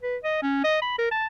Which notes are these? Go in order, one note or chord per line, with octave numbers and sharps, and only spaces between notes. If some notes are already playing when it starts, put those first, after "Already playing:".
B4
D#5
C#4
D#5
B5
A#4
A5